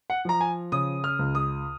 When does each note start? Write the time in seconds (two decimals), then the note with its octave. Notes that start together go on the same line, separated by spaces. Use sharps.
0.10 F#5
0.25 F3 A#5
0.41 G#5
0.72 C#3 D#6
1.04 F6
1.19 C#2
1.35 D#6